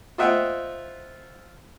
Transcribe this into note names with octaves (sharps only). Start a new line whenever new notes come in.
F4 C5 D#5 E5 F#5 G5